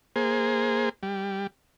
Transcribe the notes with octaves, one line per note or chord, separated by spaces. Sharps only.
A#3 G#4 C5
G3